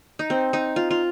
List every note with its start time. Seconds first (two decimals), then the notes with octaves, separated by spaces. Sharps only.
0.19 D#4
0.30 C4
0.53 D#4
0.76 F4
0.91 F4